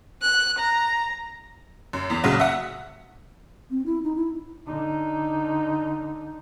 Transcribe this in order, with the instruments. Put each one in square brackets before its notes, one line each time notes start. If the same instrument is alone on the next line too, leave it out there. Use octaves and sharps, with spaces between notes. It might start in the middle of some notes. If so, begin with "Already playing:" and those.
[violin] F#6
A#5
[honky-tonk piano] F#2
E2
A#1 C#3 F#3
E5 F#5
[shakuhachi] C4
E4
D#4
E4
[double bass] D3 D#4